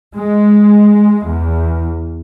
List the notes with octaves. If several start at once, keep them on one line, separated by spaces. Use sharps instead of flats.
G#3
E2